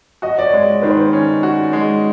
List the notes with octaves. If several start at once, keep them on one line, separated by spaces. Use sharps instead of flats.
F#4 D#5
D5
C#5
G#3
D#3 B4
C5
C#4 C#5
F#4
G#3